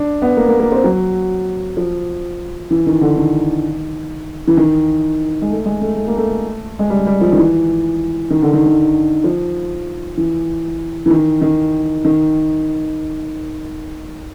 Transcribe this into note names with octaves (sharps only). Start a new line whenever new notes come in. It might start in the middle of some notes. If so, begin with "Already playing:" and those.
Already playing: D4
B3
A#3
A#3
A#3
C4
F#3
F3
E3
D#3
D3
D#3
E3
D#3
G#3
A3
G#3
A3
A3
A#3
A3
G#3
G3
G3
F3
D#3
E3
D#3
D3
D#3
D#3
F3
E3
E3
D#3
D#3
D#3